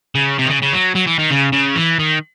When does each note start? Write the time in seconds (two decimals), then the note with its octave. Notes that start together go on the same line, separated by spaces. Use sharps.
0.15 C#3
0.38 C3
0.45 D#3
0.50 C#3
0.62 C#3
0.73 F#3
0.96 F#3
1.07 E3
1.19 D#3
1.31 C#3
1.52 C#3
1.75 E3
1.99 D#3